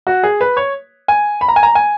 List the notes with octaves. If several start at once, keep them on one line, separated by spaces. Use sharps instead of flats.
F#4
G#4
B4
C#5
G#5
B5
A#5
G#5
A#5
G#5